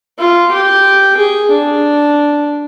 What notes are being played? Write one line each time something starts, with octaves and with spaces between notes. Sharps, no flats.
F4
G4
G#4
D4